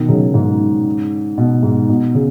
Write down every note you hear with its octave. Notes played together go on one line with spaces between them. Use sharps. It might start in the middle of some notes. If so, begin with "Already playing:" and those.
Already playing: B2 D#3
C#3 F#3
G#2 C#3
B2
G#2
B2
C#3